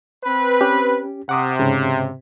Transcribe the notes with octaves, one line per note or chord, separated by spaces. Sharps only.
C4 B4
C#4 G4
C3 F#5 D6 D#6
G#2 C#3